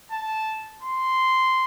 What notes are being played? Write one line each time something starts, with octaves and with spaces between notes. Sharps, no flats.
A5
C6